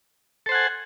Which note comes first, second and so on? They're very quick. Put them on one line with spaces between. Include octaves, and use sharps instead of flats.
A4 C5 F#5 G#5